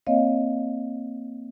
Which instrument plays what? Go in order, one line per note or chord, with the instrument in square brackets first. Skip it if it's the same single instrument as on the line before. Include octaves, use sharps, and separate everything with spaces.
[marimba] A#3 C4 C#5 D#5 F5